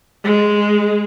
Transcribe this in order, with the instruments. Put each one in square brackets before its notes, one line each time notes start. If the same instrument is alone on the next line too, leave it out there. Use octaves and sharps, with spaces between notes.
[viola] G#3